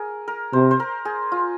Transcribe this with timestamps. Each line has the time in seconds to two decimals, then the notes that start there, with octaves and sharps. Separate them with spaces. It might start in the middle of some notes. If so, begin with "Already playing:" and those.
Already playing: G#4 A#4
0.28 A#4
0.53 C3 C5
0.71 C5
0.80 A#4
1.05 G#4
1.32 F4